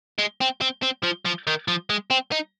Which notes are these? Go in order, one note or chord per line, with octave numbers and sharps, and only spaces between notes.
G#3
C4
C4
C4
F3
F3
D#3
F3
G#3
C4
D#4